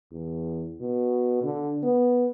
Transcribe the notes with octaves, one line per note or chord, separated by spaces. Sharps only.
E2
B2
D3
B3